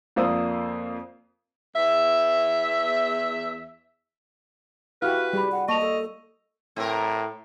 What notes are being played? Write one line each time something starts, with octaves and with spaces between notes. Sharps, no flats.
F2 A#3 C5 D5 D#6 E6
E2 E5
E4 F#4 G4 B4 F5 F6
G3 G4 G#4 B5
F#5
A#3 D#5 A5 C#6 F7
A4
A2 C4 A#4